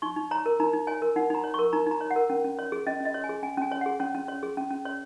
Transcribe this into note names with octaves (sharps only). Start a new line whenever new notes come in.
D#4 C#6
D#4
C#5 A#5
A#4
D#4 A#5
D#4
C#5 G#5
A#4
D#4 F#5
D#4 A#5
C#5
A#4 C#6
D#4 A#5
D#4 A#5
C#5
F#5
A#4
C#4
C#4
C#5
G#4
C#4 D#5
C#4 D#5
C#5
G#5
G#4
C#4 G#5
C#4 G#5
C#5
G#4 F#5
C#4 C#5
C#4
C#5
G#4
C#4
C#4
C#5